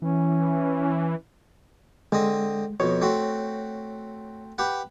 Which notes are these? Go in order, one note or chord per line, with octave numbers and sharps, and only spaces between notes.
E3 C#4
D3 G#3 C4 D#5
F2 B2 C#5
A3 C4 F#4
G4 B4 F#5